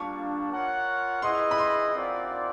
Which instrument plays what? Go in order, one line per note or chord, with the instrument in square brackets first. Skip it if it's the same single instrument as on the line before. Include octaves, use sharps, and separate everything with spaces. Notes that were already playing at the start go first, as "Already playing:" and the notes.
Already playing: [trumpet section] G3 A#3 D4 F4 [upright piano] C#6
[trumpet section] F4 A#4 C#5 F#5
[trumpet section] E4 G#4 B4 D#5 [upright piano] C6
[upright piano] B5
C6
[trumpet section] C4 F4 A#4 D5 F#5